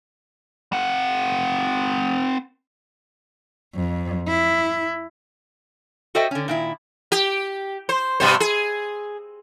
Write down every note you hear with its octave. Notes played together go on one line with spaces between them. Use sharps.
C4 F#5
F2
E4
F#4 A4 C5 D#5 E5 G5
D3 C#4
A#2 D#3 E4
G4
C5
G2 B2 C5
G#4